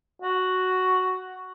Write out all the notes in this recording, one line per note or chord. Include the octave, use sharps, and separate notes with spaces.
F#4